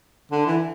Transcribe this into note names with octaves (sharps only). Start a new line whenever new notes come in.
D3
E3